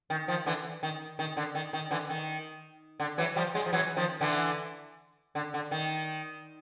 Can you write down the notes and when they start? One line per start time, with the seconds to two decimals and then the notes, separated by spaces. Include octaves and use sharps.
0.10 D#3
0.28 D#3 F3
0.46 D3 E3
0.83 D#3
1.19 D#3
1.37 D3
1.55 D#3
1.73 D#3
1.91 D3 E3
2.09 D#3
3.00 D3
3.18 E3 F#3
3.36 F3 G3
3.54 F#3 G#3
3.66 F3
3.72 E3 F#3
3.96 D#3 F3
4.21 D3 E3
5.35 D3
5.54 D3
5.71 D#3